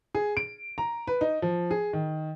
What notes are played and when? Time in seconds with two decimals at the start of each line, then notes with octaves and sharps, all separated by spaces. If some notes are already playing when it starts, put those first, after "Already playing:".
0.15 G#4
0.37 D7
0.78 A#5
1.07 B4
1.21 D#4
1.42 F3
1.71 G#4
1.93 D#3